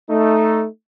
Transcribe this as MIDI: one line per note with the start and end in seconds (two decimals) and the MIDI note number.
0.10 0.66 57
0.10 0.66 63